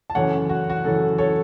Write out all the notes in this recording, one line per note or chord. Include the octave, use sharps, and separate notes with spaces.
A5
F#2 C#3 E3 A3 C#5 F#5
F#4
F#4
F#2 C#3 E3 A3 A4
A4 C#5